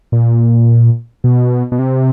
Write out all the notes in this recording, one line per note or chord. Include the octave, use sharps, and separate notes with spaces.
A#2
B2
B2
C3